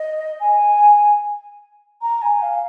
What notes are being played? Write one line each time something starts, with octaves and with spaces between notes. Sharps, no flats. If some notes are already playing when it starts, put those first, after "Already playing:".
Already playing: D#5
G#5
A#5
G#5
F5